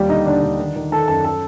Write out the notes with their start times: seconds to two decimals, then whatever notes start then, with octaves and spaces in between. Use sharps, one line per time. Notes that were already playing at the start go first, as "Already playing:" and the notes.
Already playing: D#2 G3 G4
0.09 D3 D#4 D#5
0.25 D3 D4 D5
0.42 D3
0.59 D#3
0.76 D#3
0.92 D#3 A4 A5
1.08 F#2 A4 A5
1.25 A4 A5